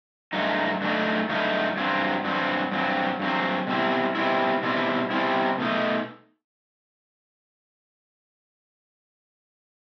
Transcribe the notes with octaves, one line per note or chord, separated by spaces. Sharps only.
G2 F#3 A3 D#4
G2 F#3 A3 D#4
G2 F#3 A3 D#4
G2 F#3 C4
G2 F#3 C4
G2 F#3 C4
G2 F#3 C4
B2 G3 C4 E4
B2 G3 C4 E4
B2 G3 C4 E4
B2 G3 C4 E4
B2 A3 D#4